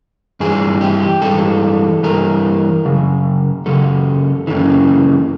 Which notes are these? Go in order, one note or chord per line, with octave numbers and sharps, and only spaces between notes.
G2 E3 G#4
G4
G2 E3 A4
G2 E3 A#4
F#2 C#3
F#2 C#3 A4
F#2 C#3 E3